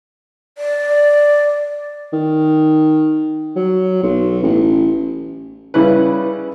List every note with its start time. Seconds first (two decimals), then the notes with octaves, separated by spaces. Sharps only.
0.58 D5
2.13 D#3
3.56 F#3
4.03 B1
4.43 A1
5.74 C#3 G3 C#4 E4 B4